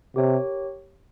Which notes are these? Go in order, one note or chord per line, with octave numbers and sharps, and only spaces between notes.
C3 G4 A#4 C#5